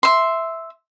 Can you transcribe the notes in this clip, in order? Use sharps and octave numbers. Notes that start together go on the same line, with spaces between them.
E5 C6